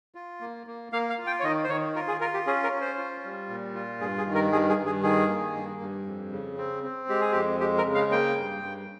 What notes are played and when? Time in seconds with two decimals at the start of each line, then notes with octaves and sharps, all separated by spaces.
0.15 F4
0.41 A#3
0.67 A#3
0.92 A#3 F5
1.10 F5
1.18 F4
1.27 G5
1.40 C#5
1.44 D#3 D#5
1.64 C5
1.69 D#3 C#5
1.95 F4 A#4
2.08 G#4
2.20 F4 A#4
2.34 G4
2.47 C#4 G#4
2.63 A#4
2.72 C#4
2.81 C5
2.98 F4
3.24 G3
3.49 A#2
3.75 F4
4.00 G2 G#4
4.18 G#4
4.26 D#3
4.35 A#4
4.52 G2 G#4
4.69 G#4
4.77 G2
4.86 G#4
5.03 D#3 G#4
5.29 A#3
5.55 G2
5.81 G2
6.06 F2
6.32 C#3
6.57 C4
6.83 C4
7.09 G#3 G4
7.21 G#4
7.32 F2 G4
7.60 G#3 G4
7.78 A#4
7.85 C#3
7.95 F5
8.11 A#3 G5
8.38 G2
8.63 G2